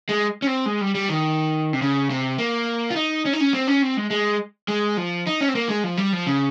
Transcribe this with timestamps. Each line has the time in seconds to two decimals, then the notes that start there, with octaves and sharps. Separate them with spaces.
0.09 G#3
0.42 C#4
0.47 C4
0.66 G#3
0.81 G3
0.95 G3
1.09 D#3
1.73 C3
1.82 C#3
2.10 C3
2.38 A#3
2.90 F4
2.96 D#4
3.25 C#4
3.33 D#4
3.40 C#4
3.54 C4
3.67 C#4
3.82 C4
3.97 G#3
4.11 G#3
4.68 G#3
4.97 F3
5.27 D#4
5.41 C#4
5.48 C4
5.55 A#3
5.69 G#3
5.84 F3
5.97 G3
6.13 F3
6.27 C#3